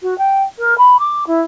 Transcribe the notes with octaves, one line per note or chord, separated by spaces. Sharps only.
F#4
G5
A#4
B5
D6
E4